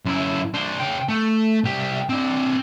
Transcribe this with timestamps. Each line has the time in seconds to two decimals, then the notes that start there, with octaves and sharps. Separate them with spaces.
0.05 F#2 E4
0.54 D4 C5
0.80 C#3 G5
1.08 A3
1.64 C2 G4
2.09 C4 D4